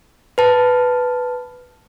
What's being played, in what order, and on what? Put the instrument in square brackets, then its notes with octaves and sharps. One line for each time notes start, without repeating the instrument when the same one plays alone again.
[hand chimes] B4 A5